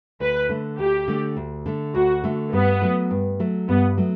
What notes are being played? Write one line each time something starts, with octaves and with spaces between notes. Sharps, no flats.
D2 B4
D3 A3
D2 G4
D3 A3
D2
D3 A3
D2 F#4
D3 A3
G2 B3
F#3 A3
G2
F#3 A3
G2 B3
F#3 A3